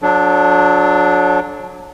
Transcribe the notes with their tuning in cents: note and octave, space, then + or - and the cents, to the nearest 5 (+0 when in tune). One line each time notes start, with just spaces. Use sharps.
F#3 -30 D4 +0 A4 -35